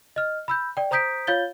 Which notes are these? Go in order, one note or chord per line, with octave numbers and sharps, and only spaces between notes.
D#5 F6
B5 E6 G6
D5 G5
C5 A#5 D#6 G6 B6 D7
F4 C#5 F5 G6 A6 G7